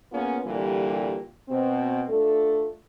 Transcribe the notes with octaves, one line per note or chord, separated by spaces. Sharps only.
A#3 B3 C#4 F4 G#4
A#2 D3 E3 G3
B2 C4
A3 D4 F4 A4